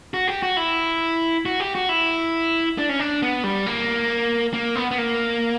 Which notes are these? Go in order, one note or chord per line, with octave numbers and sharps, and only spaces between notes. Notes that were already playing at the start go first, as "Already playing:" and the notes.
F#4
G4
F#4
E4
F#4
G4
F#4
E4
D4
C#4
D4
B3
G3
A#3
A#3
B3
B3
A#3